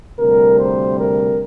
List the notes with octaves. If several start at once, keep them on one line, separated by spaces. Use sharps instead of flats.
D2 C3 G3 A#4
C5
A#4